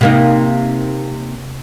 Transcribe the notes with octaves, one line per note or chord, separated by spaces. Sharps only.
C3 A#3 D#4